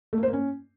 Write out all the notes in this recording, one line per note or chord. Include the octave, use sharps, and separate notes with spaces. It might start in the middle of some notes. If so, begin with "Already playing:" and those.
A3
A#3
C5
A#3
C#4